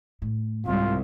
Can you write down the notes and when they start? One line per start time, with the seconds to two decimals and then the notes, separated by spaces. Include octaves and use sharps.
0.22 A2
0.66 C2 G#2 C3 F4